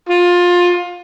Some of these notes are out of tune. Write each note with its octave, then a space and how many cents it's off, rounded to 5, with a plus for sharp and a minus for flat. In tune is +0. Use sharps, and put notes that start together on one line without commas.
F4 +20